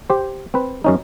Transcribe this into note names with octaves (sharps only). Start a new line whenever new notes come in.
G4 C5
C4 B4
F#2 C#4 D#4